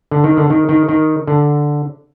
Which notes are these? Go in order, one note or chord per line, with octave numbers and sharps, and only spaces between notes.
D3
D#3
D3
D#3
D#3
D#3
D3